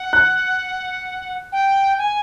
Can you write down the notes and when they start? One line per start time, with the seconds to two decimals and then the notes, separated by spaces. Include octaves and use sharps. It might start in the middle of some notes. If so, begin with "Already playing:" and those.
Already playing: F#5
0.13 F#6
1.52 G5
1.98 G#5